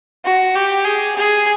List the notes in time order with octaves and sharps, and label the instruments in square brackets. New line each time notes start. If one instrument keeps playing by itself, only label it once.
[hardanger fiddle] F#4
G4
G#4
G#4